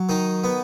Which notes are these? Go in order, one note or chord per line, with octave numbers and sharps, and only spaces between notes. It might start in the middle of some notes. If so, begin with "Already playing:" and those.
Already playing: F#3
D#3 D#4
B3